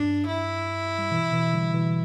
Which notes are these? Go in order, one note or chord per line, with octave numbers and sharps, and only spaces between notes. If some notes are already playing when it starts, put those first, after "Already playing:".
Already playing: G2 D4
E4
G3
B2 E3
B2 E3
D3 G3
B2 E3